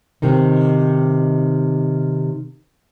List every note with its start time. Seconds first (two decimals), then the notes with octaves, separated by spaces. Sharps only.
0.22 C3 D#3 D#4